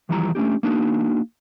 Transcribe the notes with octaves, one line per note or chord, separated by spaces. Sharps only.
D#2 E3 F3 G3 E4 A#5
A3 C#4 D4 G4
A#3 D4 D#4 F#4